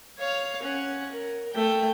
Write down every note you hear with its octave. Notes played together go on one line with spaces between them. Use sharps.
C#5 F5
C#4 F#5
A#4
A3 G5